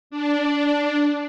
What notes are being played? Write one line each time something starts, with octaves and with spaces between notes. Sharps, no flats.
D4